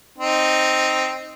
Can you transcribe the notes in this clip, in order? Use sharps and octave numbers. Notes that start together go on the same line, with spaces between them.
C4 D#4